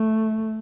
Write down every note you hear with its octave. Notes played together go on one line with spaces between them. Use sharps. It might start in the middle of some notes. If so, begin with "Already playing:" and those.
Already playing: A3